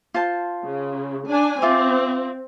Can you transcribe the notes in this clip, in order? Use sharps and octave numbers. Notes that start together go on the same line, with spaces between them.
F4 C5 A5
C#3
D4 G#5
C4 F4 E5 D6